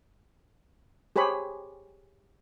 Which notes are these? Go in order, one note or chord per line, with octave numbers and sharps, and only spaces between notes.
G4 G#4 C5 C#5 B5